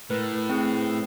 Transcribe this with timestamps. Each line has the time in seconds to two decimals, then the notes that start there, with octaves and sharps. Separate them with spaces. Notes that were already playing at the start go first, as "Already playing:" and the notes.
0.10 A2 A#4 B4
0.49 C4 G#4 B4